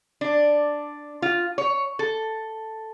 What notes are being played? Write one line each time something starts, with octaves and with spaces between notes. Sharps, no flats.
D4
F4
C#5
A4